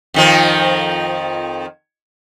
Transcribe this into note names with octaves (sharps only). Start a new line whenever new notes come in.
F2 D#3 F3